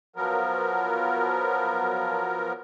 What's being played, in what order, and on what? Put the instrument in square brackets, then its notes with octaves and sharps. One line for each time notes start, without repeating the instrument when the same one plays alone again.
[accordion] F3 F#3 B3 A#4